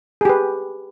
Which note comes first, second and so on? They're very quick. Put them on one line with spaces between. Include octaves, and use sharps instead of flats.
G#4 G4 B4